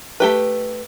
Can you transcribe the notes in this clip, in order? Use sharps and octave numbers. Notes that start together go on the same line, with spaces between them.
A3 G4 B4